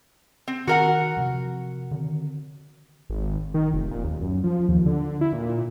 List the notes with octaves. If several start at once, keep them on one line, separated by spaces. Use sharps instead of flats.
C4
D#3 F#4 A#4 F#5
C3 F3
D3 D#3 C4
G#1
D#3
F1
A#2
D#2
F#2
F3
D#2
D3
E4
A#2